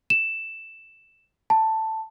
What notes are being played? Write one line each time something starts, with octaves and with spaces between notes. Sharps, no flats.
E7
A5